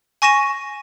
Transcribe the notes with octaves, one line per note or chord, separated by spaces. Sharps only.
G#5 C#6 A#6 D#7 E7